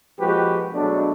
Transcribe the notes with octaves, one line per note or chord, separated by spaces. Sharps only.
A#1 F3 G#3 F#4 G4 B4
B2 F#3 G#3 A3 D4